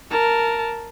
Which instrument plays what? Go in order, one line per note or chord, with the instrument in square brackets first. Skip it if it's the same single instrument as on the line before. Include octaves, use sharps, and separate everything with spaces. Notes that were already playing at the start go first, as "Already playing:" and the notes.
[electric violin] A#4 A5